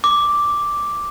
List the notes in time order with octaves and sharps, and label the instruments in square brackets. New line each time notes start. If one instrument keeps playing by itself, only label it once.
[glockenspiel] D6